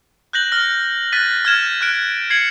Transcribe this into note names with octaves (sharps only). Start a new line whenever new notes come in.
F#6 G6 A#6 F#7
F6 A#6
F#6 A6 B6 D#7
F6 G#6 E7
F6 F#6 D7
G#6 C7 C#7 F#7